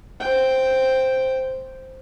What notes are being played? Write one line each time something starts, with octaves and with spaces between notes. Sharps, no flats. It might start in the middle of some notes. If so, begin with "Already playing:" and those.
C5 G5